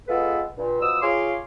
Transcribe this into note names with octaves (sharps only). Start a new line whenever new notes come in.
G#3 B3 F4 G#4 A4 B4
G2 A#2
B2 F3 D#6 E6
F4 G#4 C#5 F5 C6 D6